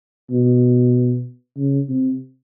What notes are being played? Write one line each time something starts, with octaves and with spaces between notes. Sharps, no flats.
B2
C#3
C3